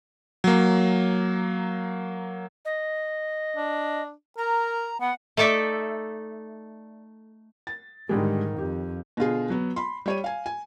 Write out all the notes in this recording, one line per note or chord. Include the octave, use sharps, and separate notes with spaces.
F#3 A#3
D#5
D4
A#4 A#5
B3 F#5
A3 D#4 A4 D5 E5
A6
G#2 D3 D#3 G3 G#3
F2 G4
B2 D3 F4 G#4
F#3 B3
B5 C6
G3 C#5 D#7
F5 G#5
G#5